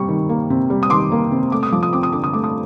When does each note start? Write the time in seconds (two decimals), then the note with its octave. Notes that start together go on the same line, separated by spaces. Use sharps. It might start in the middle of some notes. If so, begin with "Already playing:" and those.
Already playing: C3 G3 A#3 C#6
0.08 D#3
0.29 A#3
0.50 C3
0.70 G3
0.83 D#6
0.90 D#3 C6 D6
1.12 A#3
1.32 C3
1.52 A3 D6
1.63 D#6
1.72 F3 D6
1.83 D#6
1.93 C4 D6
2.03 D#6
2.12 D3 D6
2.24 D#6
2.33 A3 D6
2.44 D#6